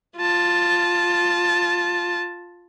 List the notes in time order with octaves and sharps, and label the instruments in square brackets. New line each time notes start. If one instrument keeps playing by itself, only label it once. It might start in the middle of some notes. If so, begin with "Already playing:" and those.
[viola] F4 A5